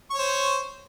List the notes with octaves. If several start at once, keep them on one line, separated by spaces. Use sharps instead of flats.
C5 C#5 C#6